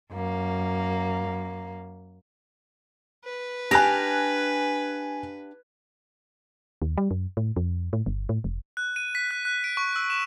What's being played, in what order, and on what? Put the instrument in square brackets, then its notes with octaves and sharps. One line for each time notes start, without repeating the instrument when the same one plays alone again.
[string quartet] F#2 A#3
[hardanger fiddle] B4
[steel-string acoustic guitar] D4 G4 F5 [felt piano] G#5 F#6 A#6
[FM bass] D#2
G3
F#2
A2
F2
A2
G1
A2
F1
[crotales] F#6
D#7
B6
F#6
F#6
D7
C#6
E6
E7